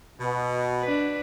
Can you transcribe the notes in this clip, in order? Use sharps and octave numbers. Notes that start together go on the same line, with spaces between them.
B2
D4 B4